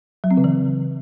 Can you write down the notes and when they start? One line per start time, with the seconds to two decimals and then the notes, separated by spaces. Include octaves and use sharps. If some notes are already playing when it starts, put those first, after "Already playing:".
0.24 F#3
0.31 C4
0.37 C#3
0.44 E3